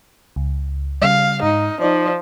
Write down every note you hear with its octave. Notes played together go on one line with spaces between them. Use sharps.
C#2
C#3 G3 F5
G#2 D#4
F3 D#4 D5